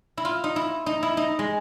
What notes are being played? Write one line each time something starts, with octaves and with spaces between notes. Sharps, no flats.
E4
F4
D#4
E4
D#4
E4
D#4
G#3